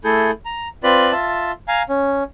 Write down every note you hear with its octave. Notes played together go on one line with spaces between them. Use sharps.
A3 E4 G#4 A4 G6
A#5
C4 F4 B4 D5 B5
F4 E5 A5
F5 G#5 A#5
C#4